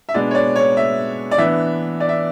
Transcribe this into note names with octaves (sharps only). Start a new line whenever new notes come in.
E5
B2 G#3 B3 D4 D5
C#5
D5
C#5
E5
D5
E3 B3 D4 E5
D5
E5